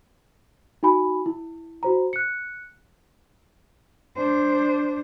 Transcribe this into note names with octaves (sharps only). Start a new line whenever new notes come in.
D#4 F#4 G#5 B5
E4
F#4 C5 A#5
F#6 C#7
D4 C5